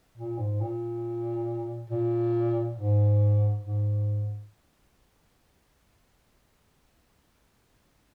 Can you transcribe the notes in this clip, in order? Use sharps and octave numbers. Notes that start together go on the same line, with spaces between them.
A#2
G#2
A#2
A#2
G#2
G#2